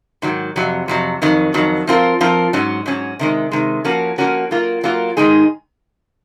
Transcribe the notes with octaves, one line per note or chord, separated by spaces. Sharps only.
G#2 D#3 F#3
F2 C3 F#3
F2 C3 F#3
F2 D#3 F#3
F2 D#3 F#3
F3 C4 F4 A#4
F3 C4 F4 A#4
G#2 F#3 C#4
G#2 F#3 C#4
C3 D#3 G#3
C3 D#3 G#3
F3 A#3 C#4 F#4 A#4
F3 A#3 C#4 F#4 A#4
F#3 A#3 F4 A#4
F#3 A#3 F4 A#4
G#2 D#3 G#3 D#4 G#4